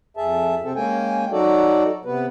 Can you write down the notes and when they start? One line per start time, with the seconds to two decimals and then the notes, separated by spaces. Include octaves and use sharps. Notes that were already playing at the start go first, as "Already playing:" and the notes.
0.17 F2 G#4 E5 A5
0.64 C3 C4 A4
0.76 G#3 A#3 C#4 G5 G#5
1.32 F#3 D#4 F#4 A4 D5
2.05 C3 B3 B4